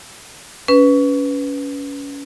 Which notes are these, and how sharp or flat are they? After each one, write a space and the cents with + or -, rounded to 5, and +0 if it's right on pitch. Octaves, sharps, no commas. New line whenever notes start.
C#4 +25 B4 +0